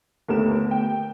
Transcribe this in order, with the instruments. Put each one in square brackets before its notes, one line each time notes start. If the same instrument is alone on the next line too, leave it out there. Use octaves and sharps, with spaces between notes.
[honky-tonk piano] D#2 A#4 E7 [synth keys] D3 A3 B3
[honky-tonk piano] G5